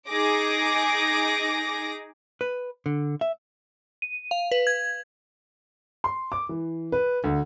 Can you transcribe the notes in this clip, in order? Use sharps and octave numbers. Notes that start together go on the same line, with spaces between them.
D#4 G#4 D6 A#6
B4
D3
E5
D#7
F5
B4
G#6
C6
D6
E3
B4
D2